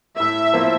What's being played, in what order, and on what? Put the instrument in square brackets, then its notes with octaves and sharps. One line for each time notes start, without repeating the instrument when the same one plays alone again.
[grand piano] A2 [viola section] E5
[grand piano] F3 A#3